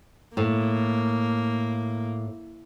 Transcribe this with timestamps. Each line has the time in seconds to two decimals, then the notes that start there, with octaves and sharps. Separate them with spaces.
0.37 A2 A#3